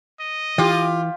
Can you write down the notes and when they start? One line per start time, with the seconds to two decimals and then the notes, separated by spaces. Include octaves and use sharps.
0.20 D#5
0.58 E3 F4 G4